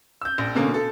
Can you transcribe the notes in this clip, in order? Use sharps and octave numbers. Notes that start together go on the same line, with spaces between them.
E6 G6
A#1
B2 D3 A#3 C#4
A4